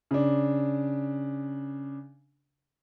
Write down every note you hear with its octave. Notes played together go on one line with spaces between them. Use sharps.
C#3 D4